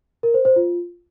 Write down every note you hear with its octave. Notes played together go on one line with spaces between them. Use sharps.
A#4
C5
C5
F4